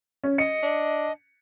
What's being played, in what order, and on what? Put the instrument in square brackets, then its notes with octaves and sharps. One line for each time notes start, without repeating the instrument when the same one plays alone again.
[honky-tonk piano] C#4
[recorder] D#5 [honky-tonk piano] C#7
[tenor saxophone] D4